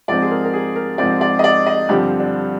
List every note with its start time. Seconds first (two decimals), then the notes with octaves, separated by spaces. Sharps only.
0.08 G#2 F3 G#3 C4 D5
0.22 G#4
0.31 A#4
0.44 A#4
0.53 G#4
0.75 A#4
0.98 G#2 F3 G#3 C4 D5
1.21 D5
1.39 D#5
1.44 D5
1.67 D#5
1.89 G2 D3 F3 C4 G4
2.20 D4